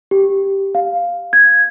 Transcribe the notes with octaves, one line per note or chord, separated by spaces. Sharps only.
G4
F5
G#6